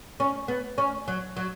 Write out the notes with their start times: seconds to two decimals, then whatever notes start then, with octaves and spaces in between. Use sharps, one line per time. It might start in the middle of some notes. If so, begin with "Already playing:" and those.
0.20 C#4
0.48 B3
0.78 C#4
1.08 F#3
1.37 F#3